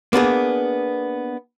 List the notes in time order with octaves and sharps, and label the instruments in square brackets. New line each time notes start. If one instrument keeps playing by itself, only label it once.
[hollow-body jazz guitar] A#3 B3 D4 G#4